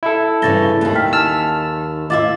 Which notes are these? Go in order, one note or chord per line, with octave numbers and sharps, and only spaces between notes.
E4 A4
G2 C#3 E3 A6 A#6 G7
D#2 D#3
G5 F6 B6
G#5 A5 E6 F6 A6
E4 F4 D#5 E5 D6 A6